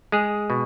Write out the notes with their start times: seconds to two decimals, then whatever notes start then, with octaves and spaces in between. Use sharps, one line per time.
0.12 G#3 G#4
0.50 B2